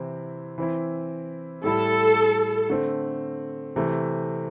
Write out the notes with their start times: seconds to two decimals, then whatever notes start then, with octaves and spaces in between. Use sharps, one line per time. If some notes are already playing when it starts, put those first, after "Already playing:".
Already playing: C3 E3 C4 E4
0.58 E3 C4 E4
1.64 A2 G3 E4 A4
2.70 D3 A3 C4
3.76 C3 E3 A3 C4